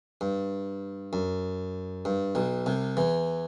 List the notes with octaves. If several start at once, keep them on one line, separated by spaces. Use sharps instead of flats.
G2
F#2
G2
B1 B2
C2 C3
E2 E3